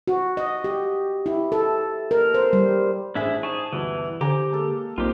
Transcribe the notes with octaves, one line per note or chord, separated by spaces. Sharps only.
F#4
D#5
G4
E4
A4
A#4
C5
G3
A1 C#4 D4 E4 G#4 C5 E5
D#4 G#4 C5 G#5 A5 C#6
D2 G2 B2 E3
D3 G4 C5 G#5 A#5
G#3 A#3 A4
B1 A#2 C4 D#4 F4 G4